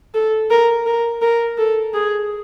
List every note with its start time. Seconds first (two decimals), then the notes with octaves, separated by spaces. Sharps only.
0.14 A4
0.50 A#4
0.86 A#4
1.22 A#4
1.58 A4
1.94 G#4